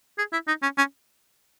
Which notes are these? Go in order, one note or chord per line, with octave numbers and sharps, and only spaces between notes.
G#4
E4
D#4
C#4
C#4